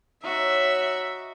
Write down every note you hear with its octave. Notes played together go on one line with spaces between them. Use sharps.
D#4 F#4 C#5 E5